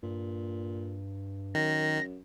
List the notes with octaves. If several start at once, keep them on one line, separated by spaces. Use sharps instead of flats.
G2 A#2
F#2 D#3 A#6